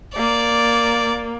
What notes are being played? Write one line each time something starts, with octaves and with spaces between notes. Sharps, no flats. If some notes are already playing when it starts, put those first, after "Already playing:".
A#3 D5